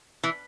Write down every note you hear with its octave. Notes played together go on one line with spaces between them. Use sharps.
E3